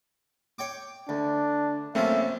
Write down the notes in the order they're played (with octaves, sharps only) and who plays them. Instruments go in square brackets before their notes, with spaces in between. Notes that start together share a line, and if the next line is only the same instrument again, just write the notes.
[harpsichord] C#5 G5 D6
[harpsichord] D2 [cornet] D4
[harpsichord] F#2 C3 F3 [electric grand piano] A3 A#3 C#4 [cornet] E5